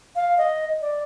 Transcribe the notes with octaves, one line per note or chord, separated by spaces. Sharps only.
F5
D#5
D5